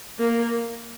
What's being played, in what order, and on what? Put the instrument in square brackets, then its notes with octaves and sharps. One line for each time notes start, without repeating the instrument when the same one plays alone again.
[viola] A#3